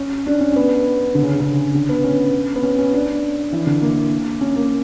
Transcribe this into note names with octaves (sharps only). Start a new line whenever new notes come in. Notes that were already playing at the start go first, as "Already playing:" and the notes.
Already playing: C#4
D4
C#4
C#4
B3
D3
C#3
C#3
D3
B3
C#4
B3
C#4
C#4
D4
E3
D3
A#3
C#4
A#3